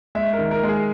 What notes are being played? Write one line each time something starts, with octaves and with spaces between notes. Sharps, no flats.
G#3 E5
A#4
D#3
A#4
G#3
G#4